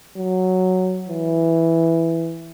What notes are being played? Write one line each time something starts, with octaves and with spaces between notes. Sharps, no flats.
F#3
E3